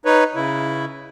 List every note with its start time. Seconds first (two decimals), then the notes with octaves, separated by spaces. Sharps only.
0.05 D#4 B4 C#5
0.35 C#3 E4